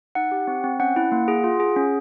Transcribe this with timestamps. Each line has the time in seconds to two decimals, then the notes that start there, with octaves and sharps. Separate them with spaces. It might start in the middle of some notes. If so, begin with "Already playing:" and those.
0.15 D#4 F#5
0.31 G4
0.47 C4
0.64 C4
0.79 C#4 F#5
0.96 E4
1.12 A#3
1.28 G#4
1.44 F4
1.60 G#4
1.76 C#4